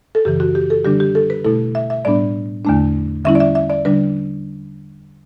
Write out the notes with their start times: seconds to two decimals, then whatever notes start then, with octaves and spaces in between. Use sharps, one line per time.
0.15 A4
0.25 F#2 C#3 E3 G4
0.40 F#4
0.55 G4
0.70 A4
0.84 D3 G3 D4 G4
1.00 G4
1.15 A4
1.30 B4
1.44 B2 A3 E4 A4
1.75 E5
1.90 E5
2.05 A2 G3 B3 D4 D5
2.65 E2 D3 A3 D4
3.25 D3 G3 C#4 E4 E5
3.35 D5
3.40 E5
3.55 E5
3.70 D5
3.85 D3 G3 D4 B4